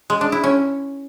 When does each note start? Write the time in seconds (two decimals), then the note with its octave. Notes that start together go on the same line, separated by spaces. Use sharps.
0.10 G#3
0.21 D4
0.32 E4
0.44 C#4